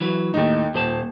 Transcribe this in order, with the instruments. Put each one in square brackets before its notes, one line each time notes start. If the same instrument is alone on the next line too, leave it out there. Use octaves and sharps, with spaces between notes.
[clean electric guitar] E3 F#3 B4
[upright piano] D#2 D#4 [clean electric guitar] A2 A3
[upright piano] D#1 [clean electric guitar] A#2 C5 A5